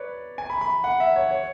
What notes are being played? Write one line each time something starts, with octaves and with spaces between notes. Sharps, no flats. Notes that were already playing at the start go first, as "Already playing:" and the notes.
Already playing: B4 C#5 D5
G#5
B5
B5
F#5
E5
C#5
C#5